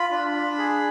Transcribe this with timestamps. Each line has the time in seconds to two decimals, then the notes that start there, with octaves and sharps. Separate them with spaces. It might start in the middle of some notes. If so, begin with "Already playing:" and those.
Already playing: F4 B5
0.11 D4
0.34 D4
0.58 G#4